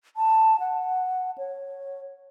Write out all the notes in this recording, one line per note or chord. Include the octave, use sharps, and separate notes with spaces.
A5
F#5
C#5